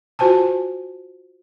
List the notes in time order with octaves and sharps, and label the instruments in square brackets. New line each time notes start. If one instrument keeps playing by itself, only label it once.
[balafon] F4 F#4 C5 G#5 A5